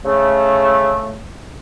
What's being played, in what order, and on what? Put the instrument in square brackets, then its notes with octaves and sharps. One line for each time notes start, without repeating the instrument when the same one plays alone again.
[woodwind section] C#3 A3